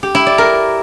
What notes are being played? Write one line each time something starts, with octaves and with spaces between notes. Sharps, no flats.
G4
E4
D5
A#4